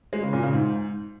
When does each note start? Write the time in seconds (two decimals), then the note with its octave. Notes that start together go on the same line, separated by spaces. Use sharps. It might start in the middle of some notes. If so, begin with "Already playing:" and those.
0.13 G#3
0.23 C#3
0.33 A#2
0.43 C#3
0.53 G#2